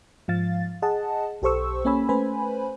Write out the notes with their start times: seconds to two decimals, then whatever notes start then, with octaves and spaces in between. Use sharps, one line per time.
0.28 G#2 F3 F5 A6
0.82 G#4 D#5 F#5 A5
1.42 B1 G4 A4 C5 C#6 E6
1.85 A#3 C#4 C#5 G#5 B5 E6
2.09 A3 C#4 B4 C5 G#5 B5